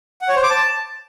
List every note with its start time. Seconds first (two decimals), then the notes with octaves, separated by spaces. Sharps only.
0.22 F#5
0.29 C#5
0.36 C5
0.43 D6
0.50 A5